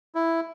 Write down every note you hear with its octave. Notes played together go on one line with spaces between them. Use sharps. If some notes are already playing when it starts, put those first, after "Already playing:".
E4